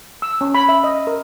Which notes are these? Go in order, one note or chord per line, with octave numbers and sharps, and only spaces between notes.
E6
C#4
B5
E5
D#5
A#4